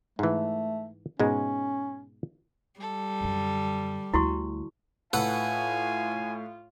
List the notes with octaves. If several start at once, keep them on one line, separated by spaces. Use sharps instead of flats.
G#2 E3 A3
G#2 B2 G#3 C#4
G3 A4
F#2 D3
D2 E4 F#4 C#6
A2 F4 A4 B4 F#5 G#5